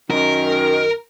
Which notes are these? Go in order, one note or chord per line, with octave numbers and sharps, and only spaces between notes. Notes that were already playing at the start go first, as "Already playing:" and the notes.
F#2 D#3 A#4